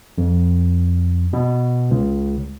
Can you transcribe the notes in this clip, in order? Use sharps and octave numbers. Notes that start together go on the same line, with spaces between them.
F2
B2
C#2